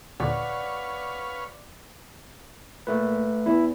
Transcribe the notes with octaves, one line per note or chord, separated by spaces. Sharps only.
D#2 A#2 D3 B4 C#5 D5 F5 F#5
A#2 A3 B4
E2 E4